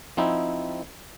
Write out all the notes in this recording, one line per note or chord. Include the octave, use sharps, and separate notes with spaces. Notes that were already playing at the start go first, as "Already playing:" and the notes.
F3 C4 D#4 E4